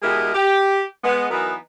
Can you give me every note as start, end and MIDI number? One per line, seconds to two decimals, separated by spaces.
0.01 0.29 47
0.01 0.29 56
0.01 0.29 64
0.01 0.29 67
0.01 0.29 68
0.01 0.29 70
0.34 0.81 67
1.04 1.25 56
1.04 1.25 59
1.30 1.54 52
1.30 1.54 54
1.30 1.54 59
1.30 1.54 63
1.30 1.54 70
1.30 1.54 71